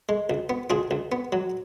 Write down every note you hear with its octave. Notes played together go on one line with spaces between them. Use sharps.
G#3
C#2
B3
C#2 F4 G#4
C#2
B3
F#3